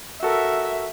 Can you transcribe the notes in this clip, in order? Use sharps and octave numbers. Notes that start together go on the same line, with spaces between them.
F#4 A4 A#4 E5